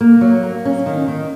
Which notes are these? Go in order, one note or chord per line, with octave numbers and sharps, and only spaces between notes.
A#3
F#3
A#3
C#4
D#3
D#3